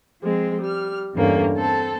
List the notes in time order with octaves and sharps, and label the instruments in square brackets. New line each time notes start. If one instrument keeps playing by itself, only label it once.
[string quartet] F3 G#3 C4
G3 F6
E2 G2 D3 A#3 C#4
C4 A4 A5